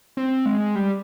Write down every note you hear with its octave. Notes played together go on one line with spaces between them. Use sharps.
C4
G#3
G3